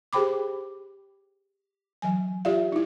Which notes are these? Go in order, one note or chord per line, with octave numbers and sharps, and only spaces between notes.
G4 G#4 C5 G5 B5 D6
E3 F#3 G#5
F4 G4 D5 E5 F5
D#4 E4